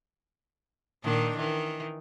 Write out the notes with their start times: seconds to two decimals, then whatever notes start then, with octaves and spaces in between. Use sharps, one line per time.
1.03 A#2 D#3 D4
1.37 D#3 E3